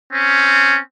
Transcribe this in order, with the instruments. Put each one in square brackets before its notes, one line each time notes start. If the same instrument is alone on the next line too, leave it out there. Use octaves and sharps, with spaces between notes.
[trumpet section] C4 C#4